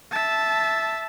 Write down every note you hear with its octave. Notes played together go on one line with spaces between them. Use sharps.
E5 A5